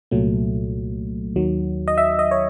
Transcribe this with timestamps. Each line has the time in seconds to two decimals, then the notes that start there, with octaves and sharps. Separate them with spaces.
0.11 C2 A#2 F#3 A3
1.36 D#2 D#3 F#3
1.88 D#5
1.98 E5
2.19 D#5
2.31 C#5